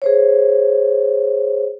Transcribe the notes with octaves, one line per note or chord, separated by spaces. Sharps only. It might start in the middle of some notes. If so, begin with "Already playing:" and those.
G#4 C5 C#5